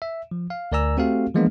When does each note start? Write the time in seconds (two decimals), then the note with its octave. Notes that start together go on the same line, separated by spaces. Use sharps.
0.02 E5
0.31 F3
0.50 F5
0.72 D2 A#4 D5 G#5 A#5 E6
0.97 A3 C4 F#4 G4 A4 F5
1.34 E3 F3 G#3 A#3 B3 D4